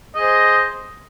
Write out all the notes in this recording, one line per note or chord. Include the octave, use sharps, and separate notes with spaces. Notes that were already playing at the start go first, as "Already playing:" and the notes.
G#4 C5 D#5